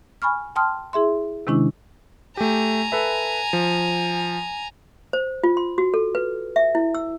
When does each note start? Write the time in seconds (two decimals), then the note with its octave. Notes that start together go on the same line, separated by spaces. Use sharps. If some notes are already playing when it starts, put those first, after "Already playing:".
0.22 G#5 B5 C#6 F6
0.56 G5 A5 C6 D#6 F6
0.93 E4 G#4 E5 C6
1.47 C3 D#3 G#3 C#4 D4 E4
2.37 A3 G4 G#5 A#5
2.92 A4 B4 E5
3.53 F3
5.13 C5
5.44 F4
5.57 C6
5.78 F#4
5.94 A4
6.15 B4
6.56 E5
6.75 E4
6.95 E6